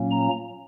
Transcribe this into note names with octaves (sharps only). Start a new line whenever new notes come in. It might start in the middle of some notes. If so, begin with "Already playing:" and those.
Already playing: A#2 F#3 A#3 C#4
A#5